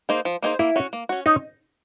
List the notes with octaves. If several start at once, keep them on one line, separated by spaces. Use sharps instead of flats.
A#3 D#4 G#4 C5
F3
A#3 D#4 G#4 C5
A#3 E4
C#4 F#4
A#3
C#4 F#4
C#4 D#4